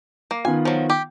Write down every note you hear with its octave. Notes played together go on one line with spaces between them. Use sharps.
A#3
D#3 B3 F4 G#5
F3 F#3
G4